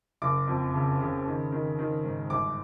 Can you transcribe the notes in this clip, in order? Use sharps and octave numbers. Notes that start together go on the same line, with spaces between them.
F#1 D6
F2
C#3
C#3
D#3
D#3
D#3
G#2
G1 D6